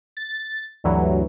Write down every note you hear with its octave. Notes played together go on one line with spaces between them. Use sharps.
A6
D2 G2 E3 F#3